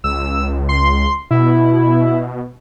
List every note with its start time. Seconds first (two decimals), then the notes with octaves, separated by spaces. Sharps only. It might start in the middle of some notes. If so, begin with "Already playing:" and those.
0.04 C#2 E6
0.69 C6
1.31 B2 E4